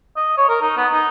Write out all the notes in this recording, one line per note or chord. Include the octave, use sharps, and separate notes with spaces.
D#5
C#5
A#4
D#4
B3
D#4